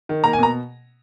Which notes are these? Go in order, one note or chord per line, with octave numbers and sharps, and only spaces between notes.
D#3
A#3 A#5
G#5
B2 A#5